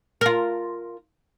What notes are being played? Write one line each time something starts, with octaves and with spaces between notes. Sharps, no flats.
F4 A#4